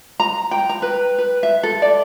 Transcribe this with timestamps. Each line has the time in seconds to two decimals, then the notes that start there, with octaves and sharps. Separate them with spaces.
0.20 A#5
0.51 G5
0.69 A#5
0.82 B4
1.18 B4
1.43 E5
1.63 A4
1.82 D5